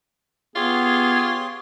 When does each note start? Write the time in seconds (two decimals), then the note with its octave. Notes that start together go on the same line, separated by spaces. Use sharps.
0.56 B3 F4 G4 G#4 C#5 C6